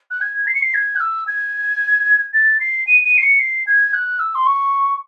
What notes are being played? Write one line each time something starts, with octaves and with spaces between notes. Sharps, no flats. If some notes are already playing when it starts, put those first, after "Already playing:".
F#6
G#6
C7
C#7
C7
G#6
F#6
E6
G#6
A6
C7
D#7
D#7
C7
C#7
C7
G#6
F#6
E6
C6
C#6